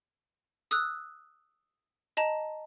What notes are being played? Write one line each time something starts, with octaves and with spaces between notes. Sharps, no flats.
D#6 E6 F#6
D#5 A5 A#5